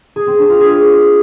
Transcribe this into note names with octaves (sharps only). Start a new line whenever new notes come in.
G#4
C4
D4
F4
G#4